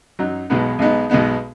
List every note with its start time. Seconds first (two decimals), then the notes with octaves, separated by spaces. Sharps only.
0.19 F#2 F#3 D#4
0.50 B1 B2 G#3 B3 D#4
0.79 B1 B2 G#3 B3 D#4
1.10 B1 B2 G#3 B3 D#4